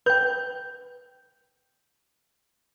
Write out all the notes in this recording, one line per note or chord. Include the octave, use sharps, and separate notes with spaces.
B4 G5 G6